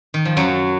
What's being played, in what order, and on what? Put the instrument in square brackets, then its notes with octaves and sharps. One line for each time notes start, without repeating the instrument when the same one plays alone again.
[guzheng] D#3
F3
F#2 F#3